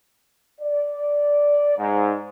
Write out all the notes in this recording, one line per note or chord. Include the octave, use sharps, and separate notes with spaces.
D5
G#2